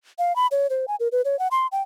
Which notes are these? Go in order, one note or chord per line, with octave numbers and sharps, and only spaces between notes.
F5
B5
C#5
C5
G#5
A#4
B4
C#5
F#5
C6
G5